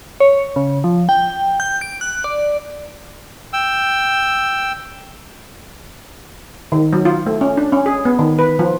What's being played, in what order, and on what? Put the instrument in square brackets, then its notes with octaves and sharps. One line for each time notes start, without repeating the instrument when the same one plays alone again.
[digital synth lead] C#5
C#3
F3
G5
G6
D7
F#6
D5
[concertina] G5 E6
[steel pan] D#3
F#3
F4
A3
C#4
D4
C#4
G#4
B3
D#3
B4
F3